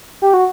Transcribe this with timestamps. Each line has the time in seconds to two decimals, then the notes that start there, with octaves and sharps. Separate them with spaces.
0.22 G4
0.34 F#4